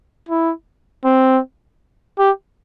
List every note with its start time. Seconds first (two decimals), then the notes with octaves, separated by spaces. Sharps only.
0.29 E4
1.05 C4
2.19 G4